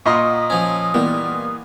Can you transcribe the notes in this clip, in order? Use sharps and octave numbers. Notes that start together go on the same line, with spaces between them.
A#2 D#5 F#5 A#5 C6 C#6 D#6
F3 C#4
E3 G3 A#3 B3